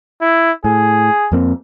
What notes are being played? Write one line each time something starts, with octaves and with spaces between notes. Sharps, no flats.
E4
A2 G#4
F2 A#3 C4